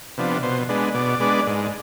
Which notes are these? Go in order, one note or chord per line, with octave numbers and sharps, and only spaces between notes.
C3 F3 B3 D4
B2 C5
G#3 B3 D4
B2 D5
G#3 B3 D4
G#2